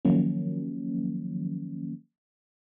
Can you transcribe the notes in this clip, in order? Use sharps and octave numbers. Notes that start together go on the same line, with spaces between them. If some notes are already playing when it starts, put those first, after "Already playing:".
D#3 F3 F#3 A#3 C#4